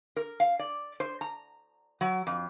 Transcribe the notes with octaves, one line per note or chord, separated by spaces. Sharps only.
A#4
F5
D5
C5
A#5
F#3
F2